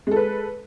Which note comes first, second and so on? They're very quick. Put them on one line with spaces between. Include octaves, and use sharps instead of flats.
G#3 A4 B4